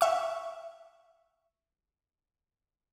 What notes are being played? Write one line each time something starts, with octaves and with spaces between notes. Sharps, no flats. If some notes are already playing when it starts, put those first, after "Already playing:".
E5 C#6